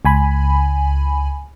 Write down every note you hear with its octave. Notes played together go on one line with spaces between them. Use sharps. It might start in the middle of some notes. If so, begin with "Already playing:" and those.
C#2 G#5 B5